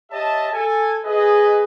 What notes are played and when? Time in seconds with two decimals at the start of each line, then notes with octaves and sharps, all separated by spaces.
0.11 G4 C#5 D#5 E5 A5
0.53 A4 G#5
1.05 G#4 B4 D#5